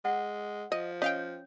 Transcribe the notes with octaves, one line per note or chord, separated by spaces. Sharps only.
G#3 F#5
F3 D#5
C#4 C#5 D#5 F5 G5